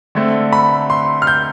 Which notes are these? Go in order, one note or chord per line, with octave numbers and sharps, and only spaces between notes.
D3 A3 C4
B5
C6
F6
G6